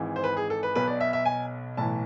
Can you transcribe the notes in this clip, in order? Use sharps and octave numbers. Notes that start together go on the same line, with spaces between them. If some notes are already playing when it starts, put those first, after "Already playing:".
Already playing: G#1 G#2 E3
C5
B4
G#4
A4
B4
B1 B2 B4
D5
E5
E5
G#5
B1 A2 E3 A5